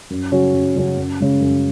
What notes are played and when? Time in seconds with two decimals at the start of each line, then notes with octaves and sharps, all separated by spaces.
0.10 F#2
0.32 C#3 F#3 C#4 F#4
0.54 F#2
0.76 C#3 F#3 C#4 F#4
0.98 F#2
1.20 C#3 G#3
1.41 F#2